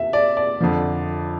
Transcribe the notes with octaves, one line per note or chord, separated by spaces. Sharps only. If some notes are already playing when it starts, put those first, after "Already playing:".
Already playing: E2 C3 E5
D5
D5
F2 D3 F3